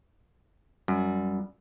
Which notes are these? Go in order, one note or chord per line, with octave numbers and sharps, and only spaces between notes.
F#2 G3